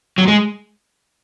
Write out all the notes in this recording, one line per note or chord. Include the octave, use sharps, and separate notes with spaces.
F#3
G#3